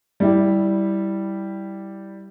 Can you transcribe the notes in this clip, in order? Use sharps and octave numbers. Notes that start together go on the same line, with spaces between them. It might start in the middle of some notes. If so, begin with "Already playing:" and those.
G3 E4 G4